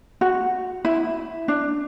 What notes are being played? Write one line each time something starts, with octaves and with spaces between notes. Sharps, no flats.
F#4
E4
D4